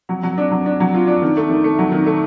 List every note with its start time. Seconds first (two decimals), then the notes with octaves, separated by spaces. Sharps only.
0.09 F#3
0.23 F#3
0.38 D4
0.51 F#3
0.66 D4
0.80 F#3
0.94 F4
1.07 D4
1.22 D#3
1.37 A3
1.50 D#3
1.64 A3
1.79 F#3
1.92 D#3
2.06 A3